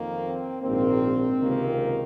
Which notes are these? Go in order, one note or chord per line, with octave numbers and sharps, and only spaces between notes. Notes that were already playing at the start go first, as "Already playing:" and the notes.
Already playing: F2 D#3 A#3
C4
A#1 G#2 D#3 A#3 C4
C#2 C3 D#3 A#3